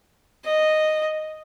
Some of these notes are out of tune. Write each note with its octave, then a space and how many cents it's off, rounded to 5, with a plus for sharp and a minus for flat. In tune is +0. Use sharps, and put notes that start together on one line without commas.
D#5 -5